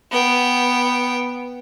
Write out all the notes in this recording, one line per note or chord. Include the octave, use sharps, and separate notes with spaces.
B3 G5